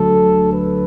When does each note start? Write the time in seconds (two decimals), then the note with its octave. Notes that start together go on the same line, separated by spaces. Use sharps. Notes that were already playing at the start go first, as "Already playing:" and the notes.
Already playing: D2 D3 F#3 A4
0.53 B4